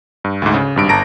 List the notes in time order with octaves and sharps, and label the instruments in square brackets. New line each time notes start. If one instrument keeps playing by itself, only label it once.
[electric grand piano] G2
D2 G#2
C#3
G#1 G2 D7
G1 A5 A#5 A#6 D7